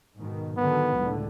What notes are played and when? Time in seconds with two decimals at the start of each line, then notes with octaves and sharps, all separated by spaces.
0.17 G#2 B2 D#3
0.58 D3 D#3 F#3 B3
0.96 C#2 A2 D3